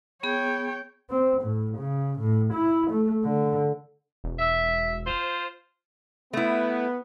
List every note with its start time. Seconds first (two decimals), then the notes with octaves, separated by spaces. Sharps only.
0.23 B3 G#4 C#5 G5
1.10 C4
1.42 A2
1.78 C#3
2.19 A2
2.53 E4
2.91 A3
3.25 D3
4.24 E1
4.39 E5
5.07 F4 C5
6.33 A3 B3 E4